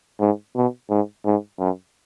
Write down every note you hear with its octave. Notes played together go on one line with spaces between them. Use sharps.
G#2
B2
G#2
G#2
F#2